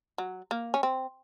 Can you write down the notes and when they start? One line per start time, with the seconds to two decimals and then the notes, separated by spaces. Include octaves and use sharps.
0.18 F#3
0.51 A#3
0.74 C#4
0.83 C4